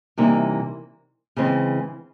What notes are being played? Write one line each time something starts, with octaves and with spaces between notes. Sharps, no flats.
C3 E3 G3 A#3 D#4
C#3 E3 G#3 C4